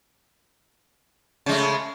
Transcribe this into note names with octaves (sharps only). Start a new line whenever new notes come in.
C#3 G#3 A3